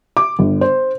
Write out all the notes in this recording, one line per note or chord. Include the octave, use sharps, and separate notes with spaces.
D6
G1
C5